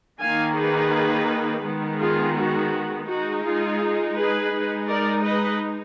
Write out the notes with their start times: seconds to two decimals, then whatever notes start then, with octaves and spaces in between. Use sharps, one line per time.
0.21 D#3 A#3 D#4 F5 G#5
0.56 G#4 B4
1.65 D#3 G#3 B3
2.01 F4 G#4
2.37 F#4
3.09 G#3 D#4 F#4
3.44 F4 G#4
4.17 G#4 B4
4.53 G#3 D#4
4.88 A#4 D5
5.25 B4 D#5